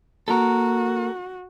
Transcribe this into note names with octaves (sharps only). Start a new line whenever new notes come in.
A#3 F#4 A4 A#4